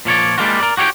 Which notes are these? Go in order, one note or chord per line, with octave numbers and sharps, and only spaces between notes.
A#2 F3 C#5 D5
G3 G#3 A#3 D4 F4 F#4
A#4 D5
F#4 G4 C#5 F#5 G5